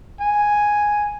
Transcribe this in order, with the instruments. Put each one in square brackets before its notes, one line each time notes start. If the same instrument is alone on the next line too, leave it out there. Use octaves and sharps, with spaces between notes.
[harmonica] G#5